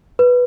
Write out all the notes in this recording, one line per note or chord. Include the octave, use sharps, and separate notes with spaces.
B4